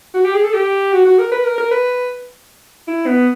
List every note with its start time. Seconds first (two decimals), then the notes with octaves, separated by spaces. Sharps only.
0.14 F#4
0.25 G4
0.34 G#4
0.45 A4
0.54 G4
0.93 F#4
1.05 F#4
1.19 A#4
1.32 B4
1.45 A#4
1.58 A#4
1.71 B4
2.88 E4
3.07 B3